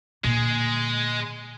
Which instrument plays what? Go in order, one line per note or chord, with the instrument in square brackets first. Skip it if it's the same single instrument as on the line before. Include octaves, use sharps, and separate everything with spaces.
[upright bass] A#2 D3 [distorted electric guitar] G#3